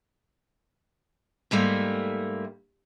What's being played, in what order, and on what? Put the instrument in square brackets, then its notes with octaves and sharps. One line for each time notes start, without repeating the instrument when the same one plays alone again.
[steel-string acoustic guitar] G#2 G3 A3 A#3